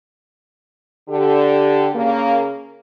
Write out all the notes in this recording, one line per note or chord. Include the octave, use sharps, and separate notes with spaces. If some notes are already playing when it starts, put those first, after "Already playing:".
D3 G4
C#3 A#3